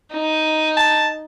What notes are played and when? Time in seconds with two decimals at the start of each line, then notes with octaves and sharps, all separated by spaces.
0.13 D#4
0.77 A5